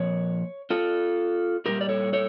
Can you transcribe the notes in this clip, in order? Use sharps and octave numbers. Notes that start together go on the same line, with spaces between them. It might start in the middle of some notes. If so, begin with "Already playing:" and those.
Already playing: A#2 F3 C#5
F4 A4
A#2 G3 A#3 G4 A#4
D5
A4 C#5
A4 C#5